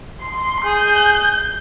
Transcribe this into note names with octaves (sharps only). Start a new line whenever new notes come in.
C6
G#4 G6